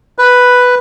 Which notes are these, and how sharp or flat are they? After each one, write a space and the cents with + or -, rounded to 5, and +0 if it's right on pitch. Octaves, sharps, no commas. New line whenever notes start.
B4 +0